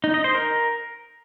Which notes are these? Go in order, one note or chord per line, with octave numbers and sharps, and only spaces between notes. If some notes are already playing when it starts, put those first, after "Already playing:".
D#4
D#5
C5
A#4